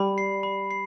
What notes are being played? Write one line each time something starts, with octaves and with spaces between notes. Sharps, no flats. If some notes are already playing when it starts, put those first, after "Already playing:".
Already playing: G3 B5
C7
B5
C7